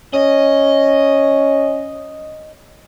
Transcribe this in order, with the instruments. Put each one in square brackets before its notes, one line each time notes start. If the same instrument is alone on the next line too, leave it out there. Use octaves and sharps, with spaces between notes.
[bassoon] C#4 [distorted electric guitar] D#5